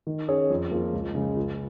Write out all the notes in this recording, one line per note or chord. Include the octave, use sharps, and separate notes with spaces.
D#3
C#4 G#4 C#5
F2
F3 A#3 F4 G#4
C#2
C#3 G#3
C#2